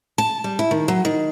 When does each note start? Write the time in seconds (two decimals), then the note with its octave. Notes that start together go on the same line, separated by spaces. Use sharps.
0.18 A5
0.44 G3
0.59 E4
0.71 D#3
0.88 F#3
1.05 D#3